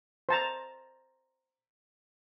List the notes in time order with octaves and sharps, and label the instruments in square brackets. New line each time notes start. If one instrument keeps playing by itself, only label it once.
[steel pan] C5 A5 A#5